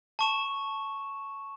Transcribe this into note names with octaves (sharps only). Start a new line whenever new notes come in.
A5 C#6 E7